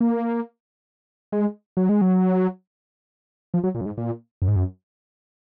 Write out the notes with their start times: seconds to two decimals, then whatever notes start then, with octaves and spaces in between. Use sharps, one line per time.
0.01 A#3
1.32 G#3
1.77 F#3
1.89 G#3
2.01 F#3
3.54 F3
3.64 F#3
3.75 A#2
3.81 F#2
3.86 G#2
3.98 A#2
4.42 F#2
4.48 G#2
4.56 F#2